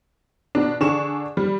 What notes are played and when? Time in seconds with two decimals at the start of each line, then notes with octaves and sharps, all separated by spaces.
0.55 B2 D4
0.80 D3 D4 G#4 C#6 E7
1.37 G3